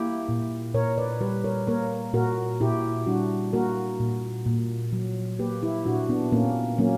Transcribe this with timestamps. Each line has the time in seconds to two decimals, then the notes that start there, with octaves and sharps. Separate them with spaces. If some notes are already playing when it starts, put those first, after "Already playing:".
Already playing: A#3 E4 G4
0.29 A#2
0.74 A#2 A#4 C#5
0.98 B4 D5
1.21 G3 G4 B4
1.44 A#4 C#5
1.67 A#3 A#4 C#5
2.14 A#2 F#4 A#4
2.60 A#2 E4 G4
3.07 G3 D4 F#4
3.53 A#3 F#4 A#4
4.00 A#2
4.46 A#2
4.93 F#3
5.39 A#3 G4 B4
5.62 E4 G4
5.86 A#2 D4 F#4
6.09 B3 D4
6.32 A#2 A#3 C#4
6.78 F#3 A#3 C#4